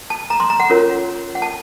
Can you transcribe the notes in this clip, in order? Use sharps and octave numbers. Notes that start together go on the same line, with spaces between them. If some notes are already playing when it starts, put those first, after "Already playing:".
A5
A#5
C6
A#5
F#5
C#4 F4 A#4 C#5
F#5
A5